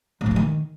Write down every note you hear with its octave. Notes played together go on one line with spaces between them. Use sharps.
A2
F3
A2
D#3